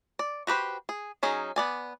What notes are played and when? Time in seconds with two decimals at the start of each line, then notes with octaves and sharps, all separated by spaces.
0.19 D5
0.47 F#4 G4 B4 C5
0.89 G#4
1.23 F#3 C#4 D#4 G#4
1.56 B3 D5 G#5